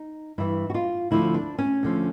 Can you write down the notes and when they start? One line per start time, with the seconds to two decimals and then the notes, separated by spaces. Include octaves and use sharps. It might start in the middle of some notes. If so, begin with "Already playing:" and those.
Already playing: D#4
0.38 G2 E3 E4
0.70 F#4
0.74 F4
1.11 D2 D3 F3 E4
1.34 D4
1.58 C#4
1.83 D2 D3 F3